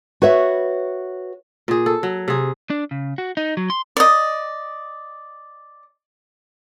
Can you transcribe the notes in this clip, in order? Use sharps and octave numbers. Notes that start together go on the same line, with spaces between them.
F#4 B4 C#5 E5
A#2 G#4
A4
F#3
C3 G#4
D4
C#3
F#4
D#4
F#3
C6
D5 D#5